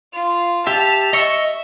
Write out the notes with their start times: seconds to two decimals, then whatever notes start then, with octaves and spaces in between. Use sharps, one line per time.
0.13 F4
0.67 G4 E5 A5 F7
1.13 D#5 E5 C#6 E6